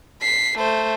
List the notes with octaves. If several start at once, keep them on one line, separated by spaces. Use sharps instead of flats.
B6 C7
A3 C5